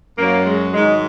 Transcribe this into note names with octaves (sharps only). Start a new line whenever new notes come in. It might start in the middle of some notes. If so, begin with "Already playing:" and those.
F#2 F#3 A#3
G#3
G#2 D#3 F#3 G#3